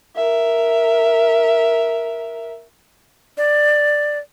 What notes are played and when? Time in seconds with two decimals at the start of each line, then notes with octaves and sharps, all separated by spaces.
0.16 A#4 E5
3.37 D5